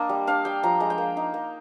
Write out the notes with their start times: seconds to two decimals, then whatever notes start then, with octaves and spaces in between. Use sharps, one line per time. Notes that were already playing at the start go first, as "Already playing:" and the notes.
Already playing: A#3 D4 D#5
0.09 G3
0.27 D4 F5
0.45 G3 G5
0.63 F3 A#5
0.80 G#3 A#5
0.90 G5
0.98 A#3
1.17 D#4
1.34 A#3